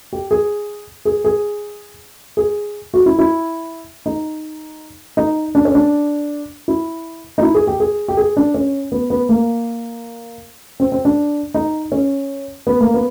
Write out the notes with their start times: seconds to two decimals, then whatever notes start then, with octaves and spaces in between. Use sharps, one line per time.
0.13 G4
0.31 G#4
1.05 G#4
1.25 G#4
2.37 G#4
2.94 F#4
3.06 E4
3.19 E4
4.06 D#4
5.17 D#4
5.55 D4
5.65 C#4
5.75 D4
6.68 E4
7.38 D#4
7.42 E4
7.55 G#4
7.67 G4
7.80 G#4
8.08 G4
8.17 G#4
8.37 D4
8.54 C#4
8.92 B3
9.10 B3
9.29 A#3
10.80 C4
10.92 C4
11.05 D4
11.54 D#4
11.92 C#4
12.67 B3
12.81 A#3
12.94 B3